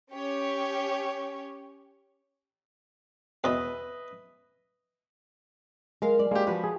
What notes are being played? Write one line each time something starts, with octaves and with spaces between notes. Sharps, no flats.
C#4 G4 C#5
E2 B2 B4 D#5 E5
G#3 A#4 F5
D5
G#3 A#3 G4
F3 F#4 B4
G#4